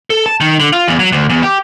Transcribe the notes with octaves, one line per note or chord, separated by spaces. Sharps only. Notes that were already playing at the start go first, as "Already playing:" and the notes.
A4
A5
D#3
D3
F4
E2
F#3
D2
E2
G4